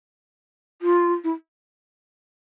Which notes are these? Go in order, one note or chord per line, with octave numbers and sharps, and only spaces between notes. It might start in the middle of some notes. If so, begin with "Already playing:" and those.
F4
E4